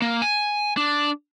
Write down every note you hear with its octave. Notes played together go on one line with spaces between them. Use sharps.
A#3
G#5
D4